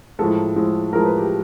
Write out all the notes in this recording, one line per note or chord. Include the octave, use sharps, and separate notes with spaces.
A2 F3 G#3 A4
A2 F3 G#3
A2 F3 G#3 A#4
B4
G4